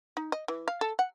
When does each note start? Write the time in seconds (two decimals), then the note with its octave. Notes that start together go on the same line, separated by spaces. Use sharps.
0.17 D#4
0.32 D#5
0.48 E3
0.68 F5
0.81 A4
0.99 F#5